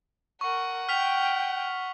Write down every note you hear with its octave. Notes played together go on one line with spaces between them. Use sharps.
A#4 F#5 C#6
G5 F6 B6 F7